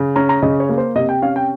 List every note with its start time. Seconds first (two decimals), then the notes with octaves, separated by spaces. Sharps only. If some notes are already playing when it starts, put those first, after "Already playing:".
Already playing: C#3
0.16 C#4 A#5
0.29 A#5
0.42 C#3 D#5
0.60 C#5
0.69 A#3
0.78 C5
0.95 C3 D#5
1.09 G5
1.22 C#4 F5
1.36 G5